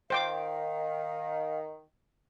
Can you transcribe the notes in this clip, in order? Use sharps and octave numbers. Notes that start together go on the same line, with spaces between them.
D#3 C5 F5 G5 D6